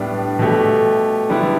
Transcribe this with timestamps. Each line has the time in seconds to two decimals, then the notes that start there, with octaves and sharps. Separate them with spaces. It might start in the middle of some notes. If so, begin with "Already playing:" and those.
Already playing: A2 G3 B3 D4
0.39 B2 A3 G4
1.29 D3 G3 B3 E4